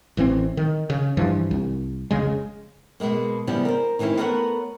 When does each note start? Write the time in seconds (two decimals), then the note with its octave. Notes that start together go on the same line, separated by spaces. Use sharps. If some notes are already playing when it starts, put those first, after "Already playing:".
0.17 A1 E3 F3 C4
0.57 D#3
0.90 C#3
1.17 G2 E3 F3
1.51 C2
2.11 F1 C#3 G#3
3.00 B2 F3 G#3 A#3
3.47 C#3 F3 G3 B3 E4 G4
3.65 A#4 C5
3.99 D#3 E3 C4 C#4 E4
4.18 A3 B3 A#4 B4 C#5 F#5